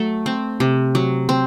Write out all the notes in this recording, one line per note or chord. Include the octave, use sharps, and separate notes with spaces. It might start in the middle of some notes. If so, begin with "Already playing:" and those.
Already playing: F#3 A3
C4
C3
F#3
C4